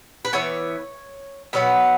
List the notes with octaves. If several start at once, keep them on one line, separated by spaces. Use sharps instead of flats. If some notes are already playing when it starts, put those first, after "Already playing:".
B4
E3 B3 C#5
B2 F#3 B3 B4